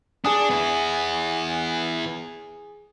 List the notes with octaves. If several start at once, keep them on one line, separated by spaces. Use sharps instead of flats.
D4 G#4 G#5 D#6
B3 E4